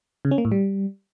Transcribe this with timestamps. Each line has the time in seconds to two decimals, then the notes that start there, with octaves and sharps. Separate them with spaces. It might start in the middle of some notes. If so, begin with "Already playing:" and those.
0.25 C#3
0.31 C#4
0.38 A#3
0.45 A2
0.52 G3